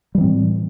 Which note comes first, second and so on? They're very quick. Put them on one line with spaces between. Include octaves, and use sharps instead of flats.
G3 E3 C4 A2